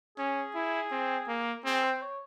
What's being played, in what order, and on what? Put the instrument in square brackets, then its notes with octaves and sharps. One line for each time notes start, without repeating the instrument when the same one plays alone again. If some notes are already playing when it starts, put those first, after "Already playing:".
[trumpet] C#4 [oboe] G#4
[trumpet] E4
C4
A#3
[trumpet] C4 [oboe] G#4
[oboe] C5
C#5